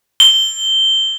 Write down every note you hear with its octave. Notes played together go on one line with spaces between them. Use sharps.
G7